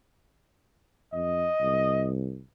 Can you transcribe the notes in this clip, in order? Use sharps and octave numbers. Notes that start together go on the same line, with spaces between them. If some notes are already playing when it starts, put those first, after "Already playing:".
F2 D#5
C2